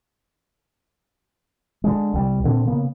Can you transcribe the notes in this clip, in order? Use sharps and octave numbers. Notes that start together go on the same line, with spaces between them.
D3 G#3
C2 G3
A#2 D3 C4
C#3 A#3 B3